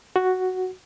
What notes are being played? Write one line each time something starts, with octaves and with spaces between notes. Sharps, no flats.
F#4